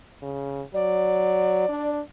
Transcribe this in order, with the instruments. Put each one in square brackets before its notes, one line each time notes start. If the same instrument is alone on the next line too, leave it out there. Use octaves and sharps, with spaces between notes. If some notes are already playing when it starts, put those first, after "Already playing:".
[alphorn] C#3
[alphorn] F#3 [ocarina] D5
[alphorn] D4